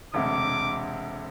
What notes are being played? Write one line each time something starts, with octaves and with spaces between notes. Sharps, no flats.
E1 D2 C3 D6